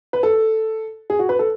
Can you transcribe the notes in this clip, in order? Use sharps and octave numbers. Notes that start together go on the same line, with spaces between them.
B4
A4
G#4
F#4
B4
A4